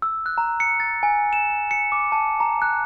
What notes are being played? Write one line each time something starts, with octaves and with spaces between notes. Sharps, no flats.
E6
F#6
A#5
C#7
A6
G#5
E7
C#7
D6
A5
A#5
F#6